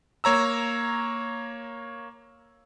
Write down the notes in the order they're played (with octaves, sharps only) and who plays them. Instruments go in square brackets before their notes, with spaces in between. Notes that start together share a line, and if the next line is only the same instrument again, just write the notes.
[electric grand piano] A#3 C#5 A#5 E6